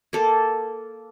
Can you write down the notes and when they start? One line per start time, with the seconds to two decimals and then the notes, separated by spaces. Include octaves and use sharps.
0.13 A#3 A4